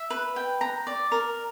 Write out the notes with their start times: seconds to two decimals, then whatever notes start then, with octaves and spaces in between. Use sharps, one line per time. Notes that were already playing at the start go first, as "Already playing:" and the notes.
Already playing: E5
0.10 B4
0.36 G5
0.61 A#5
0.87 D5
1.12 A#4